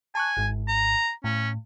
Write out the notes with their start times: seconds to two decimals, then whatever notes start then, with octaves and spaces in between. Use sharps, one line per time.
0.15 G#5 A5 C#6 F#6
0.37 G#1 G#2
0.68 A#5
1.24 A2 C#4